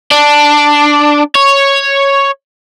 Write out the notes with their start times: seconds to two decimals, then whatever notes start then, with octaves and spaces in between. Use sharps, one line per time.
0.11 D4
1.36 C#5